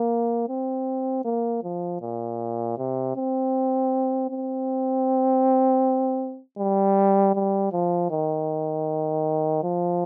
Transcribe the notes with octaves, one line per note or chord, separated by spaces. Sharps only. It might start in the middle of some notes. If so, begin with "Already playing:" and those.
Already playing: A#3
C4
A#3
F3
A#2
C3
C4
C4
G3
G3
F3
D#3
F3